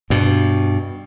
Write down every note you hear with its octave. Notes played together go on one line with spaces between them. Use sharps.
G2 B2